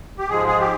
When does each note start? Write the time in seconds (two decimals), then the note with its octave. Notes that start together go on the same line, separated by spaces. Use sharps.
0.19 G4
0.29 G#2 F3 G#3 G#4
0.47 G#4
0.60 G4